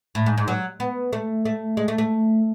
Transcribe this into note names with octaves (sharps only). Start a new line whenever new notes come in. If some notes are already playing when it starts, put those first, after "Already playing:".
A2
G#2
G#2
F#3
B3
A3
A3
G#3
A3
A3